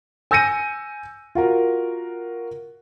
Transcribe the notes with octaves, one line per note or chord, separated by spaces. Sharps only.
G#5 E6 G6 A#6 C#7 D#7
F4 F#4 A#4